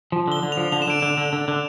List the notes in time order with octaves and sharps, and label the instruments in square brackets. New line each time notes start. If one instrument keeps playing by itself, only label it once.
[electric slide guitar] F3
[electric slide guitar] D3 [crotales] G7
[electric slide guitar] D3
[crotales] F7
[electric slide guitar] F3
[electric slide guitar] D3 [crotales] F7
[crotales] E7
[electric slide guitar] D3 [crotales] D7
[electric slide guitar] D3 [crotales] E7
[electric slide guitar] D3
D3
D3